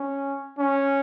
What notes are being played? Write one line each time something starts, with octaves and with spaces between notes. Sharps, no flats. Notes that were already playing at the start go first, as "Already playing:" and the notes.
Already playing: C#4
C#4